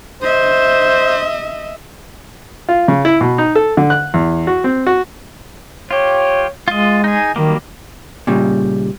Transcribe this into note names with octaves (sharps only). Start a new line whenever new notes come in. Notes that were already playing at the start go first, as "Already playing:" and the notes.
C5 D#5 E5
F4
C#3
E4
B2
D#4
A4
D3
F#6
E2
F#4
C4
F#4
F4 G4 C#5
G#3 F4 D#5
D#4 G#4
D#3 F#3 G3 A#3
A#2 C#3 G3